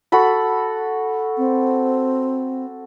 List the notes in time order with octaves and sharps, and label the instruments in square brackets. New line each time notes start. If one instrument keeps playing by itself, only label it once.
[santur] F#4 A4 B5
[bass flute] C4